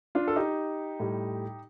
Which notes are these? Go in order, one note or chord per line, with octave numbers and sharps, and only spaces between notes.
D4 F4
A4
D#4 G4
A2 G3